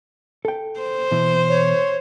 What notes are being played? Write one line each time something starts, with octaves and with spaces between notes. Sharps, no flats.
A4 G5
C5
B2 E3
C#5